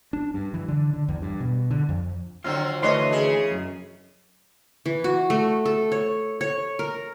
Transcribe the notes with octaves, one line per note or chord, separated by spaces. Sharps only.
D4
G2
E3
D3
D3
E2
G2
B2
D3
F2
D3 F#3 C4 F4 F5
D2 E3 D4 C#5 D#5 C6
C#3 G#4
F#2
E3
F#4
A3
A4
C#5
C#5
A#4